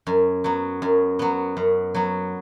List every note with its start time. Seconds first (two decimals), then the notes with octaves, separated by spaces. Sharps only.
0.07 F#2
0.44 F#3 B3
0.82 F#2
1.19 F#3 B3
1.57 F#2
1.95 F#3 B3